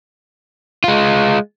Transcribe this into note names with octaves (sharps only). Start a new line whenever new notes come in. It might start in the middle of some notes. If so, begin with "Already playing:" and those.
G#3 F4